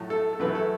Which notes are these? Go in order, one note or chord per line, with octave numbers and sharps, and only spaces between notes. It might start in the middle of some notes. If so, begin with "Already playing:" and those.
Already playing: A2 F#3 A3
A4
A4
F#2 E3 A3 B4
A4